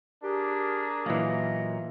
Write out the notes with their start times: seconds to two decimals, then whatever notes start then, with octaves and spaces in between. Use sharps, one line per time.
0.24 D4 G4 G#4 A#4
1.06 A#2 E3 F#3 A#3 D#5